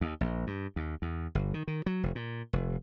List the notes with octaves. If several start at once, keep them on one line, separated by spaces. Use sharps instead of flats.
D#2
A#1
G2
D#2
E2
G1
D#3
D#3
F#3
F1
A#2
F1